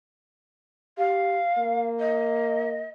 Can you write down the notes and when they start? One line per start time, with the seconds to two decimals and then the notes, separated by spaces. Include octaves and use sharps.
0.98 G4 F5
1.57 A#3
2.00 D#5